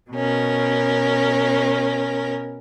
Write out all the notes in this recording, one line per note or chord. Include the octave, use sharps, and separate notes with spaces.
B2 C#4 A#4